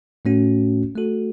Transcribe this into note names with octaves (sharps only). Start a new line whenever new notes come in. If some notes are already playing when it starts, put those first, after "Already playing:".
A2 A3 C#4 F#4
A3 F#4 A4